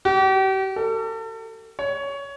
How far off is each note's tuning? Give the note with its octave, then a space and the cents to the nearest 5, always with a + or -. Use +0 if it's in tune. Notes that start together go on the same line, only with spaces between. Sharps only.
G4 -40
A4 +40
C#5 +15